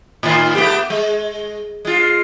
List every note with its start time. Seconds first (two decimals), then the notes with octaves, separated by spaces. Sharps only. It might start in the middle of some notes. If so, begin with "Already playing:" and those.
0.23 A2 D#3 F4
0.55 A3 B3 G4
0.90 G#3
1.85 G#3 F4